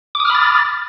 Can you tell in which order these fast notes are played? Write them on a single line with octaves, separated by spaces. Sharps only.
D6 D#6 F6 B5 A6